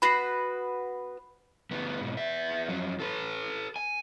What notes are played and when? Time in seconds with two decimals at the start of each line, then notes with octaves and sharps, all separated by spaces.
0.02 B3 F#4 B4 B5 C7
1.71 D2 B3
2.01 G#2 B2
2.17 B3 E5
2.68 F2 F#3
3.00 A4 B4
3.76 G#5